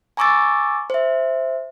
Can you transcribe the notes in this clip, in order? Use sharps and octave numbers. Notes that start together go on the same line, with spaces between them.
G#5 A#5 C#6 D6 E6 A6
C5 E5